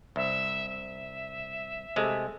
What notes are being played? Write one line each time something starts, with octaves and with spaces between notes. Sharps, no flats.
C2 E5
E5
C3 G#3 A3